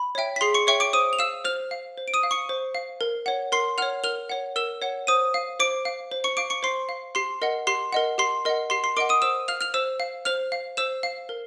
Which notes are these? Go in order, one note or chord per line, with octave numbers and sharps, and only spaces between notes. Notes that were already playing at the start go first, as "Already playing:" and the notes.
Already playing: B5
C#5 E5 G5
B6
G#4 C6 C7
C#6 C#7
C#5 E5 G5 C#6 C#7
D6 D7
C5 D#6 D#7
F7
F5 E6 E7
C5 F6 F7
F5
C5
D7
D#6 D#7
F5
C#6 C#7
C5
F5
A#4
C#5 F#5
A#4 C6 C7
C#5 F#5 F6 F7
A#4 F6 F7
C#5 F#5
A#4 E6 E7
C#5 F#5
C5 D#6 D#7
F5
C5 D6 D7
F5
C5
C#6 C#7
F5 D6 D7
C#6 C#7
C5 C6 C7
F5
G4 C6 C7
A#4 D#5 F#5
G4 C6 C7
A#4 D#5 F#5
G4 C6 C7
A#4 D#5 F#5
G4 C6 C7
C6 C7
A#4 D#5 F#5 D6 D7
D#6 D#7
C5 E6 E7
F5 F6 F7
F6 F7
C5 E6 E7
F5
C5 F6 F7
F5
C5 E6 E7
F5
A#4